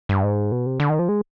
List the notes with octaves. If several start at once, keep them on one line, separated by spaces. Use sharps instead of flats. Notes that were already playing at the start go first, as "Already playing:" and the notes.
G2
G#2
B2
C3
D3
D#3
F3
G#3